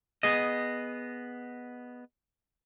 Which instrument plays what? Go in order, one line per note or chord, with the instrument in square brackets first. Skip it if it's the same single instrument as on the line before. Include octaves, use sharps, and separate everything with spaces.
[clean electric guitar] B3 G#4 D#5